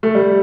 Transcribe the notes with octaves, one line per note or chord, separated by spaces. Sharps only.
A3
G3